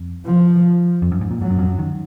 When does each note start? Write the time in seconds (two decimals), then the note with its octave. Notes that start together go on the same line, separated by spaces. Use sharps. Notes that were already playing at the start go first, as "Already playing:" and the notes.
Already playing: F2
0.26 F3
1.02 F2
1.12 F#2
1.21 G#2
1.31 A#2
1.40 G#2 F#3
1.50 F#2
1.59 F2
1.67 F#2
1.79 D#3